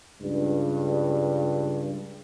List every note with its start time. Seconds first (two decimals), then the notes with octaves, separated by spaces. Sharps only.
0.21 C#2 G2